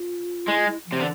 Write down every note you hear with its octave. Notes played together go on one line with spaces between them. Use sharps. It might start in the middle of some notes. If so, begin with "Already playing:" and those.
Already playing: F4
G#3 E4
F4
E4
F3
C3
D3 E3